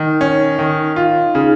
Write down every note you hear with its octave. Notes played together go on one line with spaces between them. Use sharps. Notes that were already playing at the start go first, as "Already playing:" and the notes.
Already playing: D#3 D#4
C#4
D#3
F4
C#3 D#4 G#4